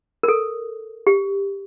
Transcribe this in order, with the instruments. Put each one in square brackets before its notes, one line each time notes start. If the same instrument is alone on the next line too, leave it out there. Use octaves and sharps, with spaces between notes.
[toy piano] A#4
A4
G4